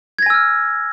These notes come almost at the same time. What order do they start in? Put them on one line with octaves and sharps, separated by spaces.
G#6 A#6 G#5 E6 F6